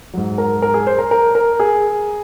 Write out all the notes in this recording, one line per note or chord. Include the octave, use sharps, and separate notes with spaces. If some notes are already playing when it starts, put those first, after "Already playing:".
G#2 F#3
A#4
A#4
G#4
C5
A#4
A#4
A#4
G#4